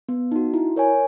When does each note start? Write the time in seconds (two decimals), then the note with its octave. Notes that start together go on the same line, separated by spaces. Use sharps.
0.09 B3
0.32 D#4 F#4
0.54 E4
0.76 A#4 C#5 G#5